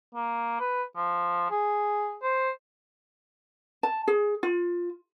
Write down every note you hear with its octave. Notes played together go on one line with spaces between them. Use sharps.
A#3
B4
F3
G#4
C5
A5
G#4
F4